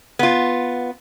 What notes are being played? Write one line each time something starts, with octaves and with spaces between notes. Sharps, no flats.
B3 F4